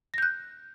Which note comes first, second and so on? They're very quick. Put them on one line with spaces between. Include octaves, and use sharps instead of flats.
A#6 G6 F#6